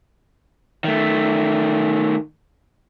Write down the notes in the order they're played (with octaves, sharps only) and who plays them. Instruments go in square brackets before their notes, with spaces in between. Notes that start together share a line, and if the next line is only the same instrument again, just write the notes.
[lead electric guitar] D#3 A3